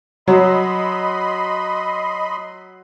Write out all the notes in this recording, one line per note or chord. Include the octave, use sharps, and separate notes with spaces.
F#3 D#5 B5 C6